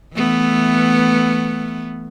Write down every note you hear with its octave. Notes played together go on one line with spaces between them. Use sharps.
E3 A3 B3